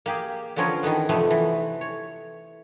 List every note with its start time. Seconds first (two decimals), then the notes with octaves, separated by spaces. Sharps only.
0.06 A#3 G4 G#4
0.56 D3 F3 B3 C#4 A#4 C#5
0.83 D#3 E3 A3 B3
1.09 F2 C3 A3 B3
1.31 E3
1.81 C#5